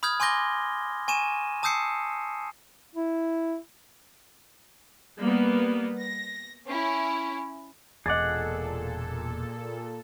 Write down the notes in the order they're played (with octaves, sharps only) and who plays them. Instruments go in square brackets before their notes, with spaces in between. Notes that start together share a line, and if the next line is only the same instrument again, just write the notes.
[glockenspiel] B5 D#6 F6 G6 G#6
G#5 C6 D6 G6 A#6 G7
G#5 C#6 D#7 E7
A5 D#6 E6 G6 C7 C#7
[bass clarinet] E4
[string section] G3 A#3 B3
A#6
C#4 E4
[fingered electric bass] E1 [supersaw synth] A#2 A4 [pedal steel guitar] G#4 F#5 [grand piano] D#5 D6 A6